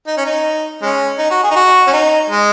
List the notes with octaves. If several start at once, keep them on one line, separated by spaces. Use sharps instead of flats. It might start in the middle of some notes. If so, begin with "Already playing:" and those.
D#4
C#4
D#4
G#3 C#4
D#4
F#4
G#4
D#4
F#4
C#4
D#4
G#3